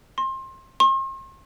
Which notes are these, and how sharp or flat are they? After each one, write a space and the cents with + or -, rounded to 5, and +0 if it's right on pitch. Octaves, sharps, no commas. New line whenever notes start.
C6 +25
C6 +45